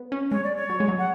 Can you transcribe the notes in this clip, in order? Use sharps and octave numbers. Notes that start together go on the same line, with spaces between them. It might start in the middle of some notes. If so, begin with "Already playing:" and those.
Already playing: B3
C#4
G#3 C#5
D5
C#5
F#3
G#3
F#3
F#5